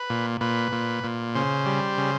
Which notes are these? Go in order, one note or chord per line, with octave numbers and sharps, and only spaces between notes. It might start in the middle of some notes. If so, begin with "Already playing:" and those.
Already playing: B4
A#2
A#2 B4
A#2
A#2
C#3 C5
G3
C#3